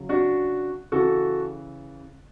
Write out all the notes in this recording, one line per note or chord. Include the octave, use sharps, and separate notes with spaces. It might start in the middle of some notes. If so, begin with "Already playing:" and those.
Already playing: C#3 F#3
D4 F#4
C#3 E3 F#4 A4